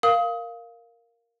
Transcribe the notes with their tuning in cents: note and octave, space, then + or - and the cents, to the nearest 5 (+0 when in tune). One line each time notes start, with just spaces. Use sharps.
A#4 +0 F5 +0 D#6 +30